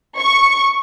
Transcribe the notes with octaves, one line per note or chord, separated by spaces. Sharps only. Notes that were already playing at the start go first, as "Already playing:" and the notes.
C#6